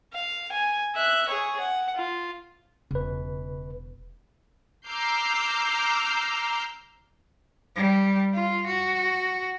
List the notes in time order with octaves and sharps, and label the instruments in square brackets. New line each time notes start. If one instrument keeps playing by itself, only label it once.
[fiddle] F5
G#5
E5 F#6
G#4 C#5
F#5
F4
[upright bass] E1 [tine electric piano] C#3 B4
[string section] A#5 D6 E6 F6 G6 C7
[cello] G3
F4
F#4